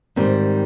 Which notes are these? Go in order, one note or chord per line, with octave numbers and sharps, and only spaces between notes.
G#2 D#3 G3 C4